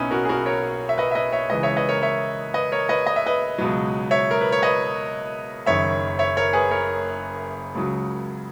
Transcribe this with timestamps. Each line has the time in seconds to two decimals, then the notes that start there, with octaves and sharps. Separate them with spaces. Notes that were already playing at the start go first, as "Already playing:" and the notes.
Already playing: B1 B2 F#3 B3 C#4 D#4 E4
0.11 F#4 A#4
0.25 G#4
0.29 F#4 A#4
0.46 A#4 C#5
0.89 E5
0.98 B4 D#5
1.11 E5
1.15 B4 D#5
1.32 C#5 E5
1.50 C#2 C#3 E3 B4 D#5
1.63 C#5 E5
1.76 B4 D#5
1.89 A#4 C#5
2.02 C#5 E5
2.54 B4 D#5
2.72 A#4 C#5
2.89 B4 D#5
3.07 D#5
3.16 E5
3.27 B4 D#5
3.58 C#2 B2 F#3
4.11 C#5 E5
4.31 A#4
4.41 B4
4.52 C#5
4.62 B4 D#5
5.66 F#1 F#2 D#3 C#5 E5
6.19 C#5 E5
6.37 A#4 C#5
6.53 G#4 B4
6.71 A#4 C#5
7.75 C#2 C#3 F#3